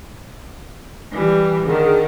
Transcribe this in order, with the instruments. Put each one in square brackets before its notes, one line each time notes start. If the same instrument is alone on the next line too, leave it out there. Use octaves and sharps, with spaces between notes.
[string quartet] E3 G3
[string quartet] D3 D#3 [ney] G#4